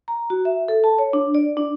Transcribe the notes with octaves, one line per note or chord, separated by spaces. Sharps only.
A#5
F#4
E5
A4
A5
C#5
D4
D5
D4